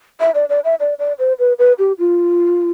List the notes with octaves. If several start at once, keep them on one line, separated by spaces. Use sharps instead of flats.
E5
D5
D5
E5
D5
D5
C5
B4
B4
G4
F4